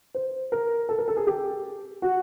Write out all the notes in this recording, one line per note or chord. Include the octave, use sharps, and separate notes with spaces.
C5
A#4
A4
A#4
A4
G#4
G4
F#4